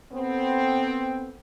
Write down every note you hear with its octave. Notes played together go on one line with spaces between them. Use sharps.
B3 C4 A4